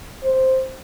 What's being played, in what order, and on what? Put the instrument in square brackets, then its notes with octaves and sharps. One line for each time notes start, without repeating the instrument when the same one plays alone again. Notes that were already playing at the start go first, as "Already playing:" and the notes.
[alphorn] C5